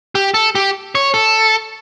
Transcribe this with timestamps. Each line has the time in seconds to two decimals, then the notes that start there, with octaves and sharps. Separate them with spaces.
0.15 G4
0.34 A4
0.55 G4
0.95 C#5
1.14 A4